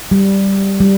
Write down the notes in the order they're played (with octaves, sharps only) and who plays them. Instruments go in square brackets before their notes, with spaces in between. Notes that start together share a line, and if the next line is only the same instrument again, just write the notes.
[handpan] G3
G3